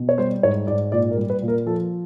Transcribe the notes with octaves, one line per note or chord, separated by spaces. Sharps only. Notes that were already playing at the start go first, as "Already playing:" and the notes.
Already playing: B2
C#5
G3 C5
G#2 C#5
G#2 D5
A#2 D5
A#4
G3
B4
A#2
A#4
F3 A4